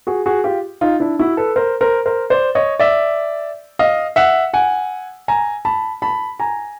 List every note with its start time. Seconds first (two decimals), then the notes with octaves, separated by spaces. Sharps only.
0.07 F#4 G#4
0.26 F#4 G#4
0.44 F4 G4
0.81 D#4 F4
1.00 D4 E4
1.19 E4 F#4
1.37 A4 B4
1.56 A#4 C5
1.81 A#4 C5
2.06 A#4 C5
2.30 C5 D5
2.55 C#5 D#5
2.80 D5 E5
3.79 D#5 F5
4.16 E5 F#5
4.54 F#5 G#5
5.28 G#5 A#5
5.65 A5 B5
6.02 A5 B5
6.40 G#5 A#5